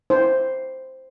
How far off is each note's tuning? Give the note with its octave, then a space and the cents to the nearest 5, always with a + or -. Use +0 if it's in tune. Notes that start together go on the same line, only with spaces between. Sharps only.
E4 +0 C5 +0